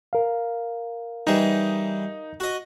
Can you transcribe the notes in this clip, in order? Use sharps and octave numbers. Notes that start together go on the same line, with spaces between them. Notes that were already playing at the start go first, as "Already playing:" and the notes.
A#4 F5
E3 G3 D#4 G#4
F#4 D#5